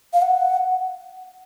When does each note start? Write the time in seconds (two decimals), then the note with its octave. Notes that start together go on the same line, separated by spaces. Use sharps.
0.13 F5
0.22 F#5